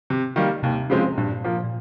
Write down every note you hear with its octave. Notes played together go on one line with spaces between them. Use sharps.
C3
D#3 G3 A#3
D#2 C3
C#3 F3 G#3 C4
C3
G2 A#2
F3 A#3
A#2